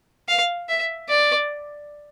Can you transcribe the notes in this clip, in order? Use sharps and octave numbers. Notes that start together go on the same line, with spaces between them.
F5
E5
D5